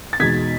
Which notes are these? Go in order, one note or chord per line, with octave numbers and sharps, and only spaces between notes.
A6
E2 B2 G#3 D#4 G#6 B6